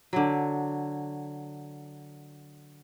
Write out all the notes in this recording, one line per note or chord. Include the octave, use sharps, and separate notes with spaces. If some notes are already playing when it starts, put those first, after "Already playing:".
D3 F#3